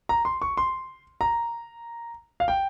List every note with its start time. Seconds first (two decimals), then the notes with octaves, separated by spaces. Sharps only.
0.09 A#5
0.25 C6
0.42 C#6
0.57 C6
1.21 A#5
2.40 F5
2.48 G5